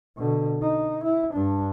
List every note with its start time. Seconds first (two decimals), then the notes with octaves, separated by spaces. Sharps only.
0.17 B2 D3
0.62 D#4
1.04 E4
1.34 G2 D4